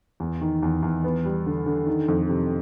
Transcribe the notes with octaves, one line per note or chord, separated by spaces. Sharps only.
E2
D#3
E2
E2
B3
G3
D3
D3
D#3
F2
C3